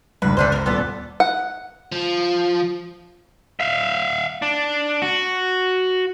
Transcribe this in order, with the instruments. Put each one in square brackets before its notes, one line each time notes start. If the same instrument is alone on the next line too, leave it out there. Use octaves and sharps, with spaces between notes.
[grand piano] G1 C#2 G2 [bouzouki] B4
[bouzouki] E3 D4 C5
A#4 C5
[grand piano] D#1 C6 [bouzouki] B3 A4 D5
[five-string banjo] F#5
[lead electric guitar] F3
[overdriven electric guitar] E5 F5
D4
F#4